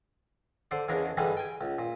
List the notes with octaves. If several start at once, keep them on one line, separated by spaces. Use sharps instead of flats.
D3 C5 D5
E2 C#3 G#3 D4 A#4
G2 D3 E3 G3 G#3
G5 G#5
C#2
A#2